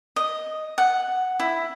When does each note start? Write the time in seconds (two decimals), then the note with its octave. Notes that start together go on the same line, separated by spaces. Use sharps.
0.16 D#5
0.78 F#5
1.40 E4